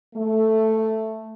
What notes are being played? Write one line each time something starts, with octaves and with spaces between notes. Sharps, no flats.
A3